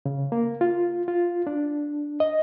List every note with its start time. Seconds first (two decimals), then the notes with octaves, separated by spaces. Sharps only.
0.06 C#3
0.32 A#3
0.61 F4
1.08 F4
1.47 D4
2.20 D#5